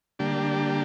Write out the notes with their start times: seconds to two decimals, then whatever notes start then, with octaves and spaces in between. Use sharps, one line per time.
0.19 D3 G3 A#3 D4 G4